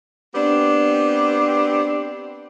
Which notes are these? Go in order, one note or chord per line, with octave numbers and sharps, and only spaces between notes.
B3 C4 D4 G4